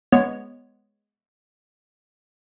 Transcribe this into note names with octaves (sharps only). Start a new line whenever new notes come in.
G#3 B3 C#5